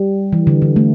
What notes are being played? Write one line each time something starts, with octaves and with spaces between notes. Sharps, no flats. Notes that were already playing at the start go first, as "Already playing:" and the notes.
Already playing: G3
E3
D3
D3
A3